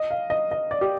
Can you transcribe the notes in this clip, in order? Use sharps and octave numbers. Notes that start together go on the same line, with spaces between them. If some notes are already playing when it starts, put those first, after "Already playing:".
Already playing: D#5
F5
D#5
D#5
D5
G4